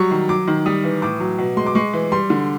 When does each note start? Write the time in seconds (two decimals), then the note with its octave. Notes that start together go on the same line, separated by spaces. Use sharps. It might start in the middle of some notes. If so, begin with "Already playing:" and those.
Already playing: F#3 G3 C#6
0.11 D#3
0.29 F#3 D6
0.48 D#3
0.66 G3 D#6
0.84 E3
1.02 A2 D6
1.20 F#3
1.39 B2
1.57 G#3 C6
1.66 D6
1.75 G#3 C#6
1.93 E3
2.12 G3 C6
2.30 D3